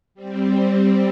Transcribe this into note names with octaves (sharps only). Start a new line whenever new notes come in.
G3 C4